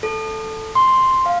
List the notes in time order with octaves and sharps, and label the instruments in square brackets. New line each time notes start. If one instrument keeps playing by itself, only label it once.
[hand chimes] A4
C6
F5